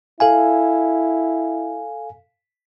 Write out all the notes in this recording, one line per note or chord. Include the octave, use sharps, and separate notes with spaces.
E4 A4 F5 G#5